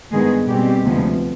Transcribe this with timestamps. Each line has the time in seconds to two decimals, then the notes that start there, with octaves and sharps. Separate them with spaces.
0.12 G2 D#3 G#3 B3 G#4
0.48 B2 G3 G#3 C4 G4
0.84 D2 C3 F3 G#3 B3